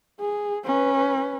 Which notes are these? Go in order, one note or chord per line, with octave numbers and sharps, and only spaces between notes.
G#4
C#4 B4